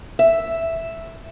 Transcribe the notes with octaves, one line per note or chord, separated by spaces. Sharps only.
E5